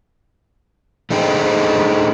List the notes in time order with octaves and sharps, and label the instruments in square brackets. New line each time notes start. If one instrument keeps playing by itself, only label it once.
[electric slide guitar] A3 D4 D#4 G#4 C5 G5